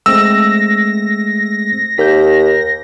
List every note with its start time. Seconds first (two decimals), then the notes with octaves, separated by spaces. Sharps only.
0.06 G#3 A3 C4 E6 A#6
1.98 D#2 G6 B6